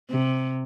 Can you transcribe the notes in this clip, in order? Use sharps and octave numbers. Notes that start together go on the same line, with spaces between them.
C3